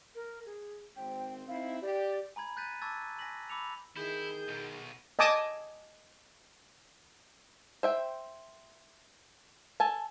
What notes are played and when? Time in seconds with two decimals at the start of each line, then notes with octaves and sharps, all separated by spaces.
0.15 A#4
0.46 G#4
0.96 G#1 C4 G5
1.48 C4 D#4 E4 F5
1.82 G4 D5
2.36 G#5 A#5 B5 G#6
2.57 F#6 G6 A6 B6 D#7
2.81 A5 C#6 D6 E6 G#6 A6
3.19 G#5 A#6 B6 F#7
3.50 B5 D6 E6 C#7 F7
3.97 D#3 E4 G#4 G6
4.48 B1 B2
5.19 D#5 G#5 A5 D6 D#6
7.83 C5 E5 G5
9.80 A4 G#5 A5